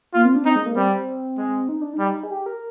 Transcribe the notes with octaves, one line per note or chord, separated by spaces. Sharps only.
A#3 F4
C4
D4
C4 D#4
G#3
A#3
G3 C4
C4
G#3
D#4
D4
D#4
G3
G#4
G4
A#4